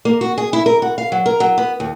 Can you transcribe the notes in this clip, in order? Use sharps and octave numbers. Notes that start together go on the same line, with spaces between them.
A#3
F#4
G#4
E4
A#4
F#4
F5
F#3
A#4
F#3
B3
D#2